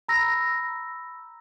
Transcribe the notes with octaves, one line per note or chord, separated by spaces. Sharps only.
A#5 B5 E6 A#6